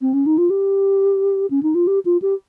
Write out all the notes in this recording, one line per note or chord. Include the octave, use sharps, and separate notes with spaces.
C4
C#4
D#4
F4
G4
C#4
D#4
F4
G4
F4
G4